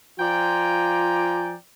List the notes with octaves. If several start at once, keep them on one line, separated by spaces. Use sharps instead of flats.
F3 F4 D5 G5 G#5 A#5